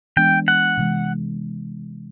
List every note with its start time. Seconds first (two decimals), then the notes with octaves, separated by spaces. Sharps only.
0.17 E3 G#3 B3 D4 G5
0.48 F#5
0.77 C3 E3 G#3